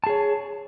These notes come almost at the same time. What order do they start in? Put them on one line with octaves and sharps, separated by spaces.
A5 G#4 C#5